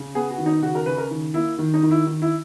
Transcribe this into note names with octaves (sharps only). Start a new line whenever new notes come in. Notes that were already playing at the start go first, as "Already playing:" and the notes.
Already playing: C#3
B3 G#4
F#4
D#3
D#4
C#3 F#4
A#4
C#3 B4
A#4
D#3
A#3 E4
D#3
D#4
D#3
E4
D#3
E4